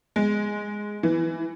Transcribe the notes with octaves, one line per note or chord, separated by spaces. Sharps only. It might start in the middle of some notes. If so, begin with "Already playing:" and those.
G#3
E3